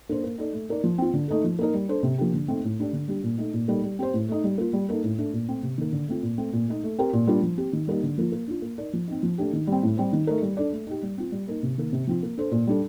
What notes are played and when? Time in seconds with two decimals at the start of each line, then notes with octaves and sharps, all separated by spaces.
0.09 A#3 D4 A4 C5
0.24 A#3
0.38 D#4 A4 D5
0.53 A3
0.69 D#4 A#4 D5
0.84 F3
0.98 C4 F4
1.13 D3
1.28 A3 D#4 A4
1.44 F3
1.59 A#3 D#4 A#4
1.74 G3
1.89 D4 A4 C5
2.03 C3
2.18 F3 A#3 D4 G4
2.34 D3
2.48 A3 C4 D#4
2.64 A2
2.78 A3 D4 G4 D5
2.93 D3
3.08 G3 D4 G4
3.23 A#2
3.38 A3 D#4
3.53 A#2
3.68 G3 A#3 D#4 A4
3.84 G3
3.99 C4 G4 C5
4.14 A2
4.28 A3 D#4
4.44 G3
4.58 A#3 F4
4.73 G3
4.89 A#3 D#4 A4
5.04 A2
5.18 A3 D4
5.33 A#2
5.49 A3 C4
5.63 C3
5.78 D#3 A#3
5.93 D3
6.08 A3 C4 F4
6.23 A#2
6.38 A3 C4
6.53 A#2
6.68 A3 D#4
6.83 A3
6.99 C4 G4 A#4
7.13 A#2
7.27 G3 A#3 D4 F4
7.42 F3
7.58 C4 G4
7.73 D#3
7.87 G3 A#3 D#4 G4
8.03 D3
8.18 F3 A#3 F4
8.32 A#3
8.48 D4 F4
8.62 A#3
8.78 D#4 A#4 D5
8.93 F3
9.08 C4 D#4
9.23 F3
9.38 A3 D4 G4
9.53 D#3
9.67 G3 C4
9.83 A2
9.97 G3 C4 G4 C5
10.13 D#3
10.27 A3 D#4 A#4
10.42 G3
10.57 D4 A4 D5
10.72 A3
10.87 D#4 G4
11.02 G3
11.18 C4 F4
11.32 G3
11.48 A#3 D#4 A#4
11.63 C3
11.78 D#3 A#3
11.93 C3
12.07 F3 C4 F4
12.23 A#3
12.37 D4 A4 C5
12.52 A#2
12.67 G3 D4 A4